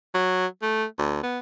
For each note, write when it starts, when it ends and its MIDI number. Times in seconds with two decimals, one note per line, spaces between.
0.14 0.46 54
0.62 0.85 57
0.99 1.19 38
1.23 1.39 59